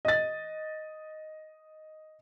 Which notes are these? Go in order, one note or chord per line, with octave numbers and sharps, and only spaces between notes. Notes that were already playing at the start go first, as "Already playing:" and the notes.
D#5 A6